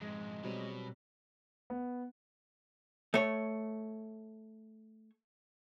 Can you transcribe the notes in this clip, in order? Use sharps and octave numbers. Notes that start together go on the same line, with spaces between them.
F2 G#2 G#3
B2 F#3 G3 C4
B3
A3 C#5